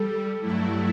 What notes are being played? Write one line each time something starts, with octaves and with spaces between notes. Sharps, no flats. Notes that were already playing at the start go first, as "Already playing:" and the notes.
Already playing: G3 A4
G2 F#3 A3 E4